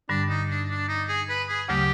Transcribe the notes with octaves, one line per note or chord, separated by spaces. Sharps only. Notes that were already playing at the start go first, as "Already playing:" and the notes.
G2 D3 G3 D4
D#4
D4
D4
D#4
G#4
B4
G#4
D2 C#3 F#3 A3 G4